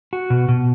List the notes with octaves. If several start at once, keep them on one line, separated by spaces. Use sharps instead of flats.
F#4
B2
B2